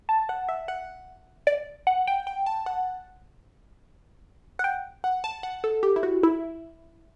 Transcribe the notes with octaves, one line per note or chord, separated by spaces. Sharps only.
A5
F#5
E5
F#5
D5
F#5
G5
G5
A5
F#5
F#5
G5
F#5
A5
F#5
A4
G4
E4
F#4
E4